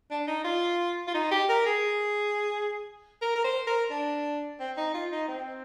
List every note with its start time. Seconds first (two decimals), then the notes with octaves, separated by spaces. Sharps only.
0.11 D4
0.28 D#4
0.45 F4
1.08 F4
1.14 D#4
1.31 G4
1.49 A#4
1.66 G#4
3.22 A#4
3.36 A#4
3.44 C5
3.67 A#4
3.90 D4
4.60 C4
4.77 D#4
4.94 F4
5.12 D#4
5.28 C4